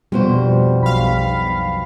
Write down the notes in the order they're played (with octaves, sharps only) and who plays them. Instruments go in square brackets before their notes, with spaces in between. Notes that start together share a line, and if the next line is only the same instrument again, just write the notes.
[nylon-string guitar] F2 B2 C5 [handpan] G3
[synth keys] B1 F5 [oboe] B5